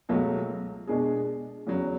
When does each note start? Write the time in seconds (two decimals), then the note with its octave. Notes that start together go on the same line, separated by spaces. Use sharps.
0.09 C#2 B2 F#3 A3
0.87 B2 G#3 D4 G#4
1.67 E2 C#3 F#3